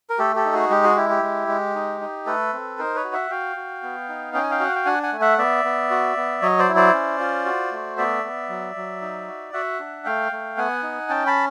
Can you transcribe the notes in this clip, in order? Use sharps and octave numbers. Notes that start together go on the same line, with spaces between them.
A#4
A3 G4 A4
G4 A4
D#4
F#4 G#4
G#3 G4
F#4 G#4
E4 G4
G4
G#3
G#3
D#4
D#4
A3 A4 B4
C4
D#4 A#4 C5
B4 C#5
F#4
E5 F#5
F#4 F5 G5
F#4
B3
D#4
C#4 G5
G#5
F5 G5
F#4 F#5
G5
D4 F#5 G#5
F#5 G#5
A3
E5 F#5
B3 D5 E5
B3
F#4
B3
F#3 C#5 D#5
C5 D5
E4
C5 D5
C#4
F4
F#4
A3
B3 D5 E5
B3
F#3
F#3
D#4
F#4
F#4 E5 F#5
D4
A3 F5 G5
A3
B3 F#5 G#5
D#4
C#4 G5 A5
A5 B5